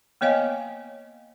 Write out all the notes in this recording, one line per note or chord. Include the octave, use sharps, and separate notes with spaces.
A#3 B3 C#5 D#5 F5 G#5